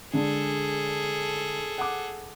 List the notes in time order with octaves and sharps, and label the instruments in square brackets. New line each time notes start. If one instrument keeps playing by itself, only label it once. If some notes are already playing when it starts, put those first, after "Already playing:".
[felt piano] D3 G#3 D4 [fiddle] G#4 A4
[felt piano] F#5 D6